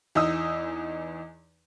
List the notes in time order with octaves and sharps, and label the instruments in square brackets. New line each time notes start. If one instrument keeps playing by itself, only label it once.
[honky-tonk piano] E2 E3 D#4 D#6 E6